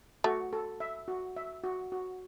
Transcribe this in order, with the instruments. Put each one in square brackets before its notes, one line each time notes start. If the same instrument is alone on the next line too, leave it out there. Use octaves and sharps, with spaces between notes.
[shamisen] A3 [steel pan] F#4
[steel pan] A4
E5
F#4
E5
F#4
F#4